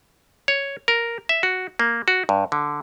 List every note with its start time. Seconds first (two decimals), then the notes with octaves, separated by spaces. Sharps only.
0.48 C#5
0.88 A#4
1.29 E5
1.43 F#4
1.79 A#3
2.08 F#4
2.29 G2
2.52 D3